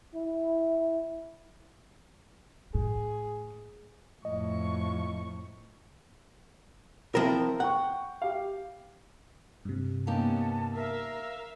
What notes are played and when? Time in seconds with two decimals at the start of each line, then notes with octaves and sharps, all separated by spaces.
0.14 E4
2.75 A2 G#4
4.25 F2 A2 D#5 C#6
7.15 F3 C4 E4 A#4
7.60 F#5 G5 C#6
8.22 G4 F5
9.65 G2 C3
10.07 A#3 B3 C#4 D#4 G4 A5
10.75 A#4 E5 F5